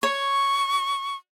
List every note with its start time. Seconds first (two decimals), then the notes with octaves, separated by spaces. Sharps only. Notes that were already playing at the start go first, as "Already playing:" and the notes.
0.03 C#5 C#6